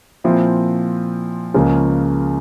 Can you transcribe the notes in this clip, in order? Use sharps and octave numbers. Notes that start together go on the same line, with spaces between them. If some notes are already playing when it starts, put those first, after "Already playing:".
A#2 F3 C4 E4
C#2 C#3 F3 A#3 C#4